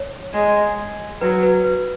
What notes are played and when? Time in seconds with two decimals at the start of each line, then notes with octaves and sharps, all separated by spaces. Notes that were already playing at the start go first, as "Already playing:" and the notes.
Already playing: C#5
0.33 G#3
1.20 F#3 B4
1.43 B4
1.64 B4